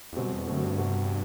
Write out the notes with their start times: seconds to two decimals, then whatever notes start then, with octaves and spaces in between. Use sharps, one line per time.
0.13 E2
0.16 F#2 B2 G3 C4 F#4
0.32 E2
0.47 F#2 D3 A3 C4 F#4
0.63 G2
0.78 C3 G3 B3 F#4